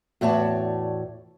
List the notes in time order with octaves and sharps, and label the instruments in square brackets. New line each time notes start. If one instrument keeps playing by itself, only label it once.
[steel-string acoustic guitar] E2 A2 F#4 C#5 D5 A5